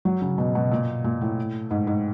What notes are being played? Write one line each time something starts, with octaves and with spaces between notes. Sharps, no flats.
F#3
C#3
B2
B2
A#2
A#2
A2
G#2
G#2